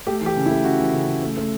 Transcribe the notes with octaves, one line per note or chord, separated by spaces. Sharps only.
A3 G4
E3
G4
C#3
E4
A3
C#3 F#4
E3
C#3
C#3
A3
A3